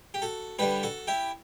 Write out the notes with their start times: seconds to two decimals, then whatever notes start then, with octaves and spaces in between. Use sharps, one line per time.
0.14 G4
0.22 F#4 A4
0.59 G2 D3 G3 G4 B4
0.83 F#4 A4
1.07 E4 G4